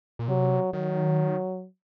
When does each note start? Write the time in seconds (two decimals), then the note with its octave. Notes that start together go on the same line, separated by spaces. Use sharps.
0.19 A#2
0.28 C3 F#3
0.73 D#3 F#3